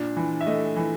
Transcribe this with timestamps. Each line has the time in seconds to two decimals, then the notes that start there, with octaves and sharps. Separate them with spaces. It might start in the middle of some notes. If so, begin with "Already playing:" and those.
Already playing: A#2 D4
0.17 E3
0.41 E5
0.46 A3 D#5
0.76 E3